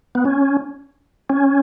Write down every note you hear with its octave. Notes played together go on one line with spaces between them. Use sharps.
B3
C#4
C#4